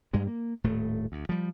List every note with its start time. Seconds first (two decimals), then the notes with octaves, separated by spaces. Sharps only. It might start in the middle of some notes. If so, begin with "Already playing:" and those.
0.13 G2 G3 G#3
0.27 A#3
0.64 D#1 A2 A3
1.12 D2
1.29 F3 G3